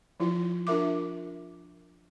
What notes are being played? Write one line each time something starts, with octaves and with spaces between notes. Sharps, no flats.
F3 E4 F4
D4 F4 A#4 E5 D6